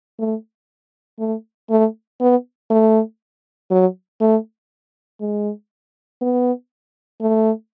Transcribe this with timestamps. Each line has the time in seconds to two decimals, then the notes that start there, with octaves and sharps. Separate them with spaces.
0.19 A3
1.19 A3
1.70 A3
2.20 B3
2.70 A3
3.71 F#3
4.21 A3
5.20 G#3
6.21 B3
7.21 A3